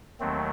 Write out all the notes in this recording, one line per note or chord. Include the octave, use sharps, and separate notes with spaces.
D#2 D#3 F#3 A3 C4